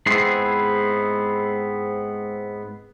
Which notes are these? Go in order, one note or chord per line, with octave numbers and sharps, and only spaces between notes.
G#2 B3 C4 E4 G#4 C6